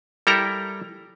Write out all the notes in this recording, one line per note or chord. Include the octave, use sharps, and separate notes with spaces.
G3 E4 A4 A#4 G5 A#5